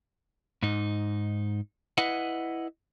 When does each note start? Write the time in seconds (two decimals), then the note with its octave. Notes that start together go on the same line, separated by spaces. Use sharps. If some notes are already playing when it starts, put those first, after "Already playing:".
0.63 G#2 D#4
1.98 E4 B4 D#5 F#5